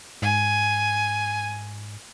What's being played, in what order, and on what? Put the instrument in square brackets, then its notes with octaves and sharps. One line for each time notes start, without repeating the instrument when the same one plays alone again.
[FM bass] G#2 [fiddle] G#5